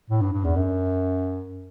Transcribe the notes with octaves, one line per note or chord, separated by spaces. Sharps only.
A2
G2
G2
E2
F#2